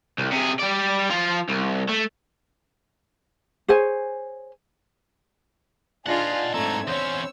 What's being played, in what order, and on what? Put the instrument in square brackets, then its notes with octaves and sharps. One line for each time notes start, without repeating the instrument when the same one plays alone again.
[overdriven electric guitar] C2
C3 G#4
G3 D5
F3 F4
C2
A3
[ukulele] G#4 C5 C#5 G#5
[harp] D4 D#4 D5 [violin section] F4 G#4 [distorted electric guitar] D#5 F#5 [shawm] A5
[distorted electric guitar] G#2 A4 [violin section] A3 G#6 [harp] C4 [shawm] A#5
[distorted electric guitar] E2 C#4 [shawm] C5 [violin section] C#5 E6